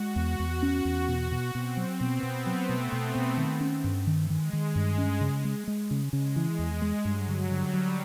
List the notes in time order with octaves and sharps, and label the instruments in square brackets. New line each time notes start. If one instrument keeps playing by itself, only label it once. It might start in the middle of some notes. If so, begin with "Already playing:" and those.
Already playing: [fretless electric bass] G#3 [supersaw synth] F#4
[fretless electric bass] E2
E2
C#4
E2
B2
B2
[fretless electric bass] B2 [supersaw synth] C4
[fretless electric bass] F#3
[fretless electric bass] B2 [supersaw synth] B3
[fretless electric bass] B2
[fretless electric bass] F#3 [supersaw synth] A3
[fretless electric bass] B2
B2
B2
D#3
C#4
G2
D#3
[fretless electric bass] D#3 [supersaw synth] G#3
[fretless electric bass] D#3
G2
C#4
C#3
G#3
G#3
C#3
[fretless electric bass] C#3 [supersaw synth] G#3
[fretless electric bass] E3
E2
G#3
[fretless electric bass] G2 [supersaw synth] F#3
[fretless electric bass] D3
[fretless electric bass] D3 [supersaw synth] G3
[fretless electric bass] F#3